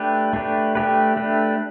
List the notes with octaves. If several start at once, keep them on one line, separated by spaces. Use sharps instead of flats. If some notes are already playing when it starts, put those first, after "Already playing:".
Already playing: A3 D4 G4 B4
A3 D4 G4 B4
A3 D4 G4 B4
A3 D4 G4 B4